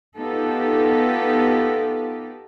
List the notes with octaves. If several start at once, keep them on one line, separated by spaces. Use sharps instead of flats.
B3 D#4 F4 G4 A4